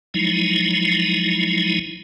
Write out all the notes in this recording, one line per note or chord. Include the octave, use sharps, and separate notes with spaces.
F3 F#3 G#3 D#4 E4